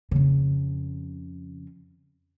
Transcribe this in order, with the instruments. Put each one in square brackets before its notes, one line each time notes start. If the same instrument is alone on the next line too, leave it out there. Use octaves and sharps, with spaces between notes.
[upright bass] F2 C#3